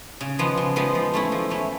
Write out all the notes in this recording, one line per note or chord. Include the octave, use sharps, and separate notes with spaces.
C#3
F3 G#3 B3
C#3
F3 G#3 B3
F3
A3 C#4 E4
F3
A3 C#4 E4